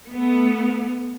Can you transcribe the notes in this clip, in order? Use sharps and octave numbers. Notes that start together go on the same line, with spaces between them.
A3 B3